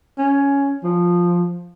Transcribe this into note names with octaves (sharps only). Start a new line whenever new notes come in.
C#4
F3